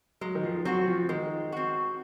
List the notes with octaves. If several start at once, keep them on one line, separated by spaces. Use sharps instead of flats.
F#3 G#3
D#3
F3
F#3 C4 F#4
F3
D#3 G#3
C4 F#4